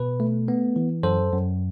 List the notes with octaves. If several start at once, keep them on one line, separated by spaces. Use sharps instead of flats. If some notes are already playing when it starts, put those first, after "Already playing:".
Already playing: B2 B4
A3
B3
E3
F#2 A4 C5
F#2